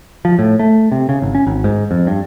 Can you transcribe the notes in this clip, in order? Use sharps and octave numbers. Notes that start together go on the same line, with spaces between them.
F3
A2
A3
C3
C#3
G#1
C#4
G#1
G#2
F2
G2